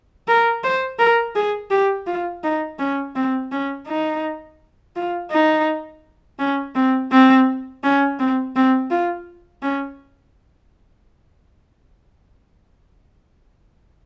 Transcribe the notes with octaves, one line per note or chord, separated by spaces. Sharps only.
A#4
C5
A#4
G#4
G4
F4
D#4
C#4
C4
C#4
D#4
F4
D#4
C#4
C4
C4
C#4
C4
C4
F4
C#4